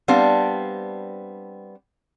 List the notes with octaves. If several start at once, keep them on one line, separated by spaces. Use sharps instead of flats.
G3 B3 C4 D4 F5